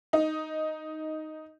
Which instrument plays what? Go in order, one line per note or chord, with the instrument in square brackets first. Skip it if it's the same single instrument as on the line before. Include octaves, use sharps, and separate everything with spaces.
[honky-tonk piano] D#4